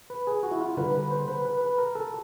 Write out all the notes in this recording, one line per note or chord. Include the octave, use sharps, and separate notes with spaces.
B4
G#4
F#4
E4
F4
D3 G3 A#3 B4
B4
C5
B4
B4
B4
A#4
A4